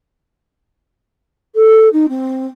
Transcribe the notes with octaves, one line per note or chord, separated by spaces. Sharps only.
A4
D#4
C4